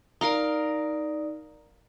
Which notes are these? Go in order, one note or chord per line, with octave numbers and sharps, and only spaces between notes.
D#4 A#4 D5 F5 A#5